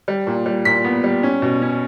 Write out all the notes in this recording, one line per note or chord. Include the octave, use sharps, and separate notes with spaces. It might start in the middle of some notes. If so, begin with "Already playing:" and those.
G3
A#2
G3
A#2 B6
B3
G3
C#4
B2
C#4